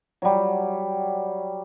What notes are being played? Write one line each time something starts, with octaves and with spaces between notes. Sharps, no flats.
F#3 G3